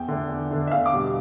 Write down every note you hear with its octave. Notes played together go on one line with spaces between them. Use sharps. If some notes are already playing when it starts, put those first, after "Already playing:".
Already playing: E2 G5
D3 A3 D4
E2
D3 A3 D4
E5
E2 F5
D6
B2 G3 D4